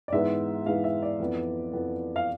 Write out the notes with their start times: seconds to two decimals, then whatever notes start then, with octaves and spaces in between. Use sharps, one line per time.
0.08 D5
0.12 G#2 E3 G#3 B3 E5
0.66 G#2 E3 G#3 B3 F5
0.84 E5
1.02 D5
1.20 F2 E3 B3
1.73 F2 E3 B3
2.16 F5